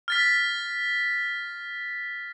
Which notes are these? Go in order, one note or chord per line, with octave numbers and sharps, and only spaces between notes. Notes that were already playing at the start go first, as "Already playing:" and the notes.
F6 A6 B6